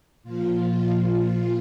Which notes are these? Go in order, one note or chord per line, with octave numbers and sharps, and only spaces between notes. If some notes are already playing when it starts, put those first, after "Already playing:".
A#2 F3 F4